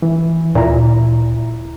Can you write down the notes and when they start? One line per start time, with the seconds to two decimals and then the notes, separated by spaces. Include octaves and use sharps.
0.02 E3
0.55 D2 A#2 E4 A#5